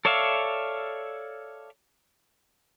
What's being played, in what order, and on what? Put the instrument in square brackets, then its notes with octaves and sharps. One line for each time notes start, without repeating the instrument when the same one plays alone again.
[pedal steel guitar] A4 C#5 D5 E5 F5